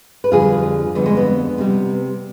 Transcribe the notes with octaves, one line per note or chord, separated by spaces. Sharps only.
B4
F2 D3 G3 F4 G#4
F2 D3 G3 B3
G#3
B3
C3 G3